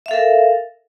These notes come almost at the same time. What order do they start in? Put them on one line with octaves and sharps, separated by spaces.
E5 F5 A4 A#4